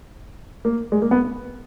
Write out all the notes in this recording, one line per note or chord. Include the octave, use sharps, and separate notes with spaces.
A#3
G#3
A#3
B3